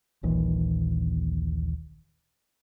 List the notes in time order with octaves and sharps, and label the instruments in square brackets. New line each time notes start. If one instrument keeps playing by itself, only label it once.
[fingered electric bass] D#1 A#1 D#2 E3